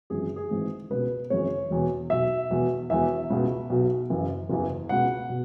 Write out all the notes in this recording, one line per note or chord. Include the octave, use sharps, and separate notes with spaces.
G#1 F#2 C#3 E3 G#4
G#4
G#1 G#2 E3
C#2 B2 B4
G#1 F#2 C#3 E3 C#5
E1 E2 B2
B1 B2 E5
E1 E2 B2
E1 E2 E3 E5
C#2 B2
B1 B2
F#1 F#2 E3
F#1 E2 E3
C#2 B2 F#5
B2